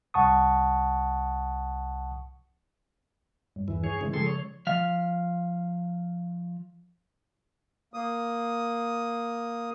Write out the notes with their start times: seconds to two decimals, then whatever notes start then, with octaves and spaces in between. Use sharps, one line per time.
0.14 C2 F#5 A5 C#6 D#6
3.56 G2
3.68 E2 E3
3.84 G#4 C#5
4.01 C#3 E3 G#3
4.14 C#3 F3 G#3 G#4 A4 C6
4.26 C#5
4.67 F3 F5
7.94 A#3 D#6